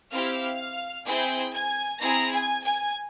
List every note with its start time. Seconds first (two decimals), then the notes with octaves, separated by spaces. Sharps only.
0.11 C4 E4 G4 F5 F6
1.06 C4 E4 G#4 G5 G6
1.54 G#5 G#6
2.01 C4 E4 G#4 A#5 A#6
2.32 G#5 G#6
2.64 G#5 G#6